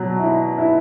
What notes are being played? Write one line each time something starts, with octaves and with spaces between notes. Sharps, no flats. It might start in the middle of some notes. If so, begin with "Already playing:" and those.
Already playing: B2 F#3
E4
E4